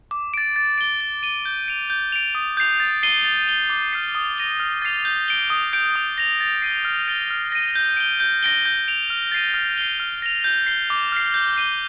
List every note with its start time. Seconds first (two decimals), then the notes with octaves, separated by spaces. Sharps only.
0.11 D6
0.34 A6 D7
0.56 A6
0.78 D7 G7
1.01 A6
1.23 D#7 G7
1.45 G6
1.68 D7 F7
1.90 G6
2.12 D7 F7
2.35 D#6
2.57 G6 C7 F7
2.80 A6
3.03 C7 D#7 G7
3.25 A6
3.48 D#7 G7
3.70 D6
3.93 F6 C7
4.15 D#6
4.38 A#6 D#7 G7
4.60 F6
4.82 A6 C7 F7
5.05 G6
5.28 D7 G7
5.50 D#6
5.73 G6 D7
5.96 D#6
6.18 A#6 F7
6.40 A6
6.62 C7 D#7 G7
6.85 F6
7.08 A6 D7 G7
7.30 F6
7.52 A#6 D#7
7.75 G6
7.97 D7 G7
8.20 G6
8.43 A#6 D7 G7
8.65 G6
8.88 D7 F7
9.10 F6
9.32 A6 C7 D#7
9.54 F6
9.78 C7 G7
10.00 F6
10.22 A#6 F7
10.44 G6
10.66 C7 G7
10.90 D6
11.12 F6 C7
11.34 G6
11.56 C7 D#7 G7